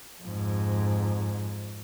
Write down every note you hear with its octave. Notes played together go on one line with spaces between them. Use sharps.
F2 G#2